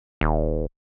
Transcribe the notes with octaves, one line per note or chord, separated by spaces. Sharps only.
D#1